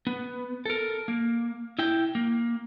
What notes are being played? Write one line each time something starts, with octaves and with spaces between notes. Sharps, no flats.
B3
A4 A#4
A#3
E4 G5
A#3